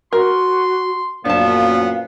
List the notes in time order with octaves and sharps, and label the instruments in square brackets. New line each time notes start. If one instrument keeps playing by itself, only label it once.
[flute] F#4 [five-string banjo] A#4 [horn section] C6
[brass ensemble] F#2 A#2 [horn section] F3 B3 [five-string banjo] D4 A5 [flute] F5